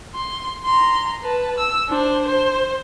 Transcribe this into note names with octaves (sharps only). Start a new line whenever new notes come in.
C6
A#5 C6
B4 A5
E6
D4 C5
C5